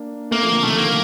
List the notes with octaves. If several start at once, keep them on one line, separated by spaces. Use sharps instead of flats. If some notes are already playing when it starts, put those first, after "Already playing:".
Already playing: A#3 D4
A3 A#3 C4
F3 A3
D3
C3 D#3 A3
A#3